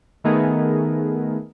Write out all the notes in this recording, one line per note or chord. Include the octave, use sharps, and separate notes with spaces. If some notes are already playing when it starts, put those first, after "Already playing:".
D#3 A3 B3 D#4 G#4 A#4